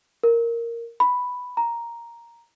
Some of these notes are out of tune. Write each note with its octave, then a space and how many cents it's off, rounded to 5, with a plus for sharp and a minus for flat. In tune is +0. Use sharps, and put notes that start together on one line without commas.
A#4 -5
B5 +5
A#5 +5